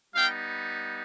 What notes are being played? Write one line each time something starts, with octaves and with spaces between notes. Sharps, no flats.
G3 B3 D#4 F5 G5